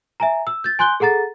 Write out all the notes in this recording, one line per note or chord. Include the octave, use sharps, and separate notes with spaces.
E5 G#5 A#5
E6
G6 A6
G#5 C6 F#6 G6 G7
G#4 A4 F#5 A#5 A6